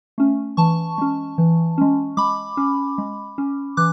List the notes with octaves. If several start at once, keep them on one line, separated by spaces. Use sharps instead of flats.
A3 C#4
E3 A5 C#6
G#3 C#4
E3
G#3 C#4
G#3 B5 D6
C#4
G#3
C#4
E3 D6 F#6